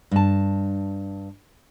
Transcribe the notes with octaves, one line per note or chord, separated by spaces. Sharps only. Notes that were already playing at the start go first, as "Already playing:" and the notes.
G2 A5